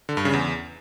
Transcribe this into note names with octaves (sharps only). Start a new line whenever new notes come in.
D3
G2
C#3
E2